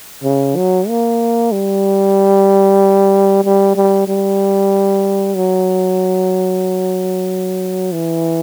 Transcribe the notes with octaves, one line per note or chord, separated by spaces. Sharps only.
C#3
F#3
A#3
G3
G3
G3
G3
F#3
E3